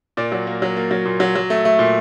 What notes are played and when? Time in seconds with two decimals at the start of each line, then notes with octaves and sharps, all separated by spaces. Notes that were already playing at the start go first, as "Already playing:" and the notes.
0.17 A#2 D5
0.32 F#3
0.47 A#3
0.62 F#3
0.77 A#3
0.91 F#3
1.05 A#2
1.20 F#3
1.35 F#3
1.50 A3
1.65 A3
1.79 A#2